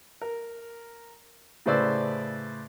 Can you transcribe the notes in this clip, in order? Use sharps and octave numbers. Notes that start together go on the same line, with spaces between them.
A#4
A2 C#3 B4 C5 D5 E6